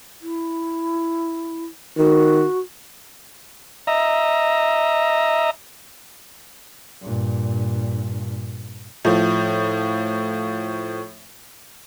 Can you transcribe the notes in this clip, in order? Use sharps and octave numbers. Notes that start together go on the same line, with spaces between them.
E4
D#3 F#4
D#5 E5 A#5
G2 A#2
A2 F3